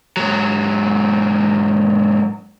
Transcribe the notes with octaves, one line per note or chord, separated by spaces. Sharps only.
G#2 F#3